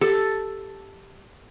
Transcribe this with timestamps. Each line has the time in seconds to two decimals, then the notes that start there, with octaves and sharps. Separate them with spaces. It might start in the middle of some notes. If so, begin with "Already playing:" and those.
0.01 G4 A4